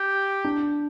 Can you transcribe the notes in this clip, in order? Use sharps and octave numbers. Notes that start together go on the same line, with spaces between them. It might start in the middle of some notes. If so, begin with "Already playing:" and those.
Already playing: G4
D4